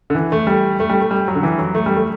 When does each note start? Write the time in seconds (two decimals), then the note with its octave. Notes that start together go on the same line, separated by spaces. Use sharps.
0.10 D3
0.15 E3
0.32 A3
0.47 G3
0.80 A3
0.90 G3
1.01 A3
1.11 G3
1.28 F#3
1.35 D3
1.43 E3
1.59 F#3
1.75 A3
1.86 G3
1.97 A3